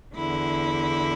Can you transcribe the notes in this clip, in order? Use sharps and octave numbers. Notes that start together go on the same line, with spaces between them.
E2 D3 E4